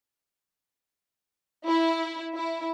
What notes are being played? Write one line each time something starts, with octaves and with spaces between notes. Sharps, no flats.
E4
E4